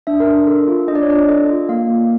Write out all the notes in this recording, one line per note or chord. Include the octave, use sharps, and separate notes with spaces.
D4 E5
A#4
D4
A4
F4
D4 D#5
D5
C#5
D4 D5
A4 D#5
F4
A#3 F5
A#3